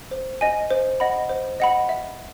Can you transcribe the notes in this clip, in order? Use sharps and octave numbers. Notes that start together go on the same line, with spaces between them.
C5
D#5 G#5
C5
D#5 F#5 B5
C5
D#5 F#5 B5
E5